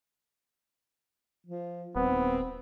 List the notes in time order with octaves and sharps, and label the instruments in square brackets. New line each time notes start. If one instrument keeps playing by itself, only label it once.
[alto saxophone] F3
[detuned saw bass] D#1 [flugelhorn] B3 [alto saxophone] C4